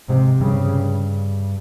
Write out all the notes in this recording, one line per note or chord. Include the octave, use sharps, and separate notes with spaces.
G#2 C3 G#3
G2 C#3 G3